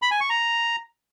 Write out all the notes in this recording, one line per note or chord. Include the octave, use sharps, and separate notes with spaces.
B5
G#5
C#6
A#5